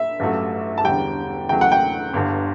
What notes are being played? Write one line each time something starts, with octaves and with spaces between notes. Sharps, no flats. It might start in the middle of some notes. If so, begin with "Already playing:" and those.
Already playing: E5
A1 G2 F#3 A3
A5
E1 E2 D3 G3 G5
E2 C#3 F#3 A3 G5
F#5
G5
G1 G2 D3